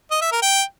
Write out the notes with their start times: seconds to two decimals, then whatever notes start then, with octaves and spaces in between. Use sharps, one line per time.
0.11 D#5
0.21 E5
0.32 A#4
0.42 G5